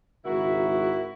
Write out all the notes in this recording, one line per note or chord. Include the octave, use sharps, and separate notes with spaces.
G#1 C#2 E4 F#4 A#4